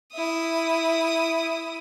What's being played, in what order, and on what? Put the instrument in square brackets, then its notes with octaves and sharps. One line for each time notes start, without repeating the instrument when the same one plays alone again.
[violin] E4 D#6